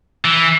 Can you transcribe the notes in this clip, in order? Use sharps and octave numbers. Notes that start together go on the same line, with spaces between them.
E3